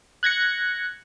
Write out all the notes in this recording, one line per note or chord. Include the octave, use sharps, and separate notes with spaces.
F#6 G#6 A#6 C#7